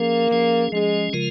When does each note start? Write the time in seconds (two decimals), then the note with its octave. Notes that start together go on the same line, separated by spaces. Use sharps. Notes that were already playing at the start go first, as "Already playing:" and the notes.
Already playing: F3 A#3 C#4 G#4
0.31 F3 C#4 G#4
0.72 F3 G#3 C#4 G#4
1.13 C#3 F3 G#3 F4 A#4